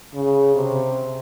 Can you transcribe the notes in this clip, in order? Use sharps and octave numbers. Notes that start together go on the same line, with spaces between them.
C#3
C3